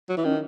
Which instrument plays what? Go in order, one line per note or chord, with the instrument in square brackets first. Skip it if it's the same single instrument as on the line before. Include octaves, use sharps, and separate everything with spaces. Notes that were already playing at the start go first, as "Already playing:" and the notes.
[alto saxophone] F#3
E3
[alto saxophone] D#3 [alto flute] C#4